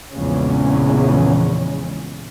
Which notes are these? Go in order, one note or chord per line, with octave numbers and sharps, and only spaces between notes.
A#1 E2 C#3 G#3 C#4